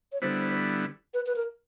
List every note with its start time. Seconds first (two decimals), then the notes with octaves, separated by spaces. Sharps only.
0.13 C#5
0.22 D3 G3 B3 E4 C5
1.14 B4
1.26 B4
1.36 A#4